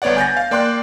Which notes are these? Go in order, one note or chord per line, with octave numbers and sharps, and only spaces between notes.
G1 B3 C#5 D5 F#5
G#5 G6 A6 A#6
F5
A#3 D5 G5 C6 D6 F#6